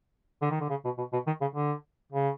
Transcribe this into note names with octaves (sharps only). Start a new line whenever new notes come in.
D3
D#3
D3
C#3
B2
B2
B2
D#3
C#3
D3
C#3